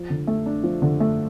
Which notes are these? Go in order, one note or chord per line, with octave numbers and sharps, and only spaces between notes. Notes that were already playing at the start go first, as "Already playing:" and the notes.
Already playing: F3
D3
A3
D4
F3
D3
A3